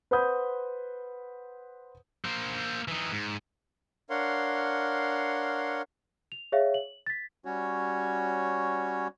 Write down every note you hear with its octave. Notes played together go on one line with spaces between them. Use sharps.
B4 C5 F#5 B5 D#6 G6
A#3 C5
E3 D#4
G#2
D4 A#4 C#5 F5 F#5 C6
F7
G#4 C#5 E5 F5
F#7
A6 B6
G3 C#4 F#4 C#5